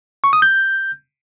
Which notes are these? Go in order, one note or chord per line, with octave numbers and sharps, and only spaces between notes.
C#6
D#6
G6